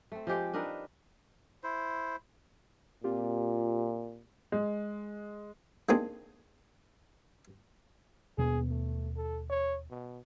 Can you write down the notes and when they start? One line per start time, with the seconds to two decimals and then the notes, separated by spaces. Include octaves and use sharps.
0.12 A3 C4
0.27 F3 G#3 G4 G5
0.53 D4 D#4 A#4 B4
1.63 E4 C5
3.04 A#2 C4 F4 G4
4.52 G#3
5.89 G#3 A#3 C4 D4 D#4 G#4
8.38 D#2 B2 B3 G#4
8.69 A3
9.16 A4
9.50 C#5
9.90 B2